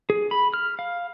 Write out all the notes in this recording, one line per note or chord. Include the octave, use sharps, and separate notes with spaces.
G#4
B5
F6
F5